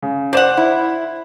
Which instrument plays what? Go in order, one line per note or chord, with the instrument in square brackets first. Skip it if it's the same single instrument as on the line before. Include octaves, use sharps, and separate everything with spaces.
[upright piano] C#3
[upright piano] C5 E7 [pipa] D5 F#5
[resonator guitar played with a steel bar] E4